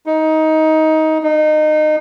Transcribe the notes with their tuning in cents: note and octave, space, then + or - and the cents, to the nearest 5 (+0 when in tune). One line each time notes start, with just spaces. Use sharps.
D#4 +15
D#4 -25